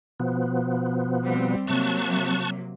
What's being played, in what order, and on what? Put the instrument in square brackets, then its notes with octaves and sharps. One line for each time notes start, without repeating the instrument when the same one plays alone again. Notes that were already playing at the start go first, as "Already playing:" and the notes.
[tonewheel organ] B2 F3 B3
[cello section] G3 C4
[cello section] C3 F#3 A#3 [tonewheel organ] A5 C#6 F#6